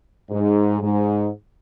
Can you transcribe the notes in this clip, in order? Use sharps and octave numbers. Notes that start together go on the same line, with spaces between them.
G#2
G#2